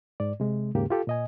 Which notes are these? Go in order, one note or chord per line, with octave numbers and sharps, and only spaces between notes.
G#2 D5
C3 G#3
D#2 G#2 C#3 A#3 G4
F4 G4 A4
A#2 D#5 G#5